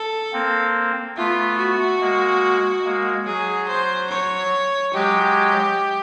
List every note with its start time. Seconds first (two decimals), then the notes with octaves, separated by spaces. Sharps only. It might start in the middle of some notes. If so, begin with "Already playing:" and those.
Already playing: A4
0.33 A#3 C4
1.17 A3 B3 F4
1.58 F#4
2.00 G#3 A#3
2.84 G#3 A#3
3.26 F#3 G#4
3.68 C5
4.10 C#5
4.94 F#3 G#3 G4